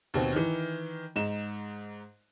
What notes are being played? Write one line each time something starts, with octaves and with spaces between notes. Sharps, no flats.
D#2 B2 C4
D#3 E3
G#2 D#4 E7